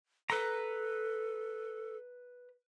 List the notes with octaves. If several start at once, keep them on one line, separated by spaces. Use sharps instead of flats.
A4 B4 A#5